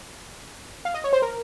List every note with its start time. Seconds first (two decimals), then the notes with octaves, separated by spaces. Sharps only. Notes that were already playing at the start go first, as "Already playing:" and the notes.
0.85 F5
0.94 D#5
1.04 C#5
1.13 C5
1.22 A#4